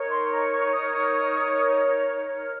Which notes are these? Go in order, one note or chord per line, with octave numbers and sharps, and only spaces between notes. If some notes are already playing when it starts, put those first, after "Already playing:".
Already playing: D#4 A#4 C#5
C6
A#5
C#6
D#6
F6